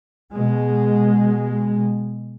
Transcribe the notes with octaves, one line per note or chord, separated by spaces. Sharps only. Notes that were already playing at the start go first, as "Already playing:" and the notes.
B2 G#3